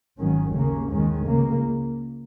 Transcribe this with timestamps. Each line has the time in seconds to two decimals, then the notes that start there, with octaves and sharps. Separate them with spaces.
0.19 G#1 G#2 D#3 F#3 C#4
0.55 D#2 C#3 A#3 C#4
0.90 D#2 D#3 G#3 C#4
1.26 C#2 C#3 A#3